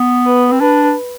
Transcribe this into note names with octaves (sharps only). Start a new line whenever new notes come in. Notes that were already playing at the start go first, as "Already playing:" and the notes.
Already playing: B3
B4
C4
D4 B4